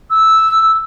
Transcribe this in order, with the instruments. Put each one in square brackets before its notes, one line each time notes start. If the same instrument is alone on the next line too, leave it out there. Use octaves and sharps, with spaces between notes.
[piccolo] E6